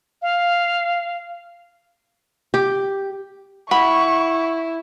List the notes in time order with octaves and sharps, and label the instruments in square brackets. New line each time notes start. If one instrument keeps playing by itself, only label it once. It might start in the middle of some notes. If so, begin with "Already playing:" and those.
[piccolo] F5
[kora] G4
[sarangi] E4 [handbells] F#5 [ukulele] B5 [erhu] C#6